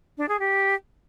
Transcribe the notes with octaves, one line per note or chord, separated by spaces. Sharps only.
D4
G#4
G4